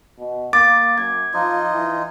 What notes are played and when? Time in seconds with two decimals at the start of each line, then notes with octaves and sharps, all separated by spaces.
0.19 B2
0.53 A#3 D6 A6
0.98 F#2 G#6
1.34 F3 D#4 F4 D#5
1.72 E3